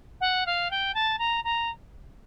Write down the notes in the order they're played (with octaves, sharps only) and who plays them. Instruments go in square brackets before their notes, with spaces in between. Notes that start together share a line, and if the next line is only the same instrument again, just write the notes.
[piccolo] F#5
F5
G5
A5
A#5
A#5